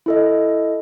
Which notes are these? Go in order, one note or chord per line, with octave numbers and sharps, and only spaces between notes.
E4 A4 D#5